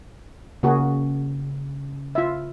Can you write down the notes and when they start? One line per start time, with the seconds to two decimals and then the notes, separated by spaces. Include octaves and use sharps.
0.63 C#3 A#3 F#4 G#4
2.15 F4 E5